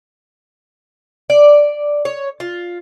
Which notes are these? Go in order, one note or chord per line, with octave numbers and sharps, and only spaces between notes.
D5
C#5
F4